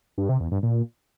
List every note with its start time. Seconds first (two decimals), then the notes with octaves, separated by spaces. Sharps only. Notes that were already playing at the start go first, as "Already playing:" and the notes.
0.18 G2
0.29 C3
0.40 E2
0.52 G2
0.63 A#2